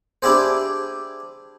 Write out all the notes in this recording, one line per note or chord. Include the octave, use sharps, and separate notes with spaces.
D4 E4 G4 G#4 C5